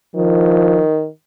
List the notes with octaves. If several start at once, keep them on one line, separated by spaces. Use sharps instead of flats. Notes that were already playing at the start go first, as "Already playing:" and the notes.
D#3 F3